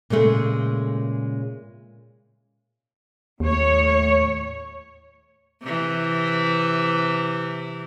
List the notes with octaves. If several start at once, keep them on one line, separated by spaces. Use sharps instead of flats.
A#2 C#3 G#3 A3
D#2 A2 C#5
C3 E3